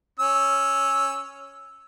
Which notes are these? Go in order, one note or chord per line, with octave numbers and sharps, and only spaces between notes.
C#4 E6